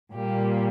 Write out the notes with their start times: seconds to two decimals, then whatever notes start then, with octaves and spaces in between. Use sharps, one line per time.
0.13 A#2 G3 A#3 G4